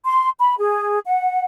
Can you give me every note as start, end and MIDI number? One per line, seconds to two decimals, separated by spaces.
0.05 0.30 84
0.40 0.54 83
0.58 0.98 68
1.06 1.45 78